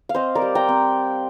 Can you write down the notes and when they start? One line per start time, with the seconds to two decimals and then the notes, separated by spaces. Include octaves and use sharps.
0.09 F5
0.14 C4 C5 D#5
0.35 A#4 D5
0.42 G3
0.55 G5 A#5
0.68 C4